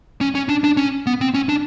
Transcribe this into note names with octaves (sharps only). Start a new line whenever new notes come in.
C#4
C#4
D4
D4
C#4
B3
C4
C#4
D4